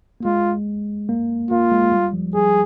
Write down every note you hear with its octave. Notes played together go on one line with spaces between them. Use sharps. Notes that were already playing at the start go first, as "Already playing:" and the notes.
A#3
G#3 F4
A#3
A#3 F4
G#3
G3
F3
G3 G#4